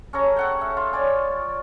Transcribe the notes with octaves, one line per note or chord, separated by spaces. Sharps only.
C#4 A4 C#5 A#5
A4 F#5 G5
E5
F4
C#5 D5 G#5